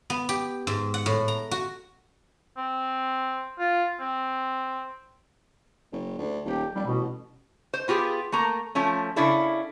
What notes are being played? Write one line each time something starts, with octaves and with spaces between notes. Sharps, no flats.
B3
G4
G#2
F#5
A2
A#5
F#4
C4
F4
C4
F#1
D2
D#1 G4
F1 G3
A1 B2
C5
B3 F4 G4 G#4
A3 A#3 A#5
F3 A3 C#4
C#3 C#4 D4 E4 A4